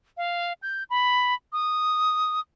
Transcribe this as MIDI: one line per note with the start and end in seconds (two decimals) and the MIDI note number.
0.17 0.53 77
0.62 0.83 91
0.90 1.34 83
1.53 2.40 87